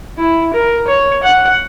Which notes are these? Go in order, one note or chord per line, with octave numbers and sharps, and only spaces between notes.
E4
A#4
C#5
F#5